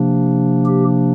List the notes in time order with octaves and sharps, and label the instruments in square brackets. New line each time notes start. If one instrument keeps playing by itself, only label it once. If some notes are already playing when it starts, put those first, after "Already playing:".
Already playing: [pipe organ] C3 F3 A#3 D4
G4